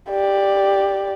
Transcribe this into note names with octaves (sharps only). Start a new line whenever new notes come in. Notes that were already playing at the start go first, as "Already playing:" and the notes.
G4 D5